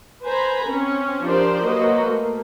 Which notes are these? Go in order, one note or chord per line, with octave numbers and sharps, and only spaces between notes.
B4 C5 G#5 A#5 B5
C4 C#4
F3 D4 G4 A#4 C5 D5
F#3 A#3 F#4 B4 C5 D#5
A3 A#3